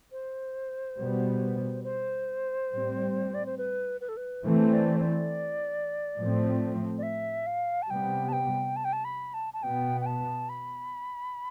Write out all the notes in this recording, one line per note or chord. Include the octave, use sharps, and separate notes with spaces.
C5
B2 G3 B3
C5
A2 G3 C4
D5
C5
B4
B4
A4
B4
E3 A3 C4 C5
D5
C5
D5
A2 F3 A3 C4
D5
E5
F5
A5
C3 G3 B3 G5
A5
G5
A5
G5
A5
B5
A5
A5
B2 B3 G5
G5
A5
B5